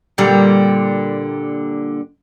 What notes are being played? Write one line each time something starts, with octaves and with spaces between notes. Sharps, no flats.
A#2 D3 G3